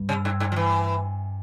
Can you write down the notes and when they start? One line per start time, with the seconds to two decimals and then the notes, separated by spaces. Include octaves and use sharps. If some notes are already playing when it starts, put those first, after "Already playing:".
Already playing: G2
0.09 C3
0.25 G#2
0.40 G#2
0.52 F3
0.56 E3